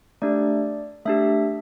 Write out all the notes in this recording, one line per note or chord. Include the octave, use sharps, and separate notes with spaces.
A3 D4 G4 D5
A3 D4 G4 E5